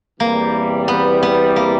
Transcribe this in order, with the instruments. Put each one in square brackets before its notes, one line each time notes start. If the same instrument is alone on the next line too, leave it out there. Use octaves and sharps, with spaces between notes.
[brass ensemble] E2 C3 E3 G3 [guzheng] A#3
[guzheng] B3
B3
A#3